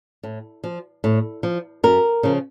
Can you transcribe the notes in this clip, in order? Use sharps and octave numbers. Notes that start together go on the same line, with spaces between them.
A2
F3
A2
F3
F#2 A#4
C#3 F3